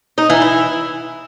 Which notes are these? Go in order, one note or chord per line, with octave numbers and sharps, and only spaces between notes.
D#4
E3
E4